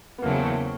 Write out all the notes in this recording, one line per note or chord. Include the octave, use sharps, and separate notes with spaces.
B3
E2 C#3 F#3 A3 A#3 C4